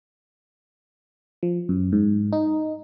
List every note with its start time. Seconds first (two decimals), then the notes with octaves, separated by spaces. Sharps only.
1.43 F3
1.69 F#2
1.93 G#2
2.33 D#4